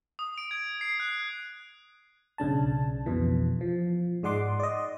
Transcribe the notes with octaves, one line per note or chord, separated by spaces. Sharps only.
D#6
D7
G#6
C7
F#6
B1 C#3 D4 A5
F2 B2 E3
F3
G#2 G#3 D5 F#5 C6 D6
D5 D#5